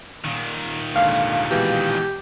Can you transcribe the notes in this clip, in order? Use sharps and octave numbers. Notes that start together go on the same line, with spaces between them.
A#2 D#3
D#2 G#2 D3 F5
B2 E3 G#3 G4